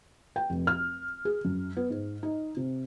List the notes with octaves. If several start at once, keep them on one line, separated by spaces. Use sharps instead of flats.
G5
F1
F6
G#4
F#2
B3
G#2
D#4
C3